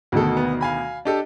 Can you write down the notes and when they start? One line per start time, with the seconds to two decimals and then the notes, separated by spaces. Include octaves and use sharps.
0.12 D2 B2 D#3 F#4 A4
0.37 B3
0.61 F5 G#5 B5
1.05 D4 G4 A4 D#5